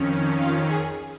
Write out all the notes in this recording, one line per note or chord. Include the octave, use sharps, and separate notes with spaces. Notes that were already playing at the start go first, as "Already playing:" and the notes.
Already playing: F2 D#3 C#4
F4 F5
G#4 G#5